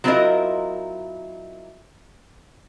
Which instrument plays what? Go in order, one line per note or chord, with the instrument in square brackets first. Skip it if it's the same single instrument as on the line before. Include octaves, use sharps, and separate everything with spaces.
[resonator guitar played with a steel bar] F#3 C4 E4 F4 A#4 D#5